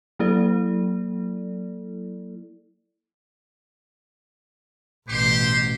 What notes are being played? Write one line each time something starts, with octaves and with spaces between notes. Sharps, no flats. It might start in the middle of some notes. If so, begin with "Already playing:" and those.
F#3 A#3 E4 A4 D5
A1 B2 G4 C5 C6